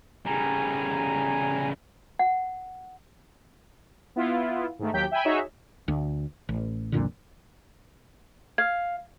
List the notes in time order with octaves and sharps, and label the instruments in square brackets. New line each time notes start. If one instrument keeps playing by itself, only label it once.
[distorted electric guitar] C#3 G3 [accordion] G#5 A#5
[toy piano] F#5
[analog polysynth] B3 E4 F4
G#2 D#3 A3
D#2 F#3 G4 G5 G6 B6
E5 G5 G#5 B5
D#4 F#4 G#4 C#5 E5
[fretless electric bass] D2
A1
C2 F2 A#2 D3
[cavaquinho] F5 [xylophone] G#6